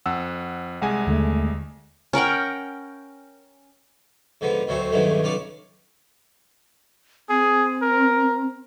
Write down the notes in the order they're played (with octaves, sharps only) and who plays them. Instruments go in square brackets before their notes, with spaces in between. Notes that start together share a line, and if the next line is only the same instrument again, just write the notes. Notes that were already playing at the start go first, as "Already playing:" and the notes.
[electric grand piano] F2 F#5 E6
[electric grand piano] C2 G#3 G#5 [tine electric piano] F#5
[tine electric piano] D#2 D3 A3
[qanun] C#4 A#4 F#5 G5
[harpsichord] G#2 D3 F3 B3
D2 B2 F#3 A3 C4
B1 G2 D#3 F#3 G#3 A3
B1 C#3 F4 D5 C#6
[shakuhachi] C4 [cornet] G#4
[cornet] A#4